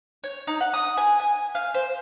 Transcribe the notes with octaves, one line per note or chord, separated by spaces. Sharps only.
C#5
D#4
F#5
D#6
G#5
G#5
F5
C5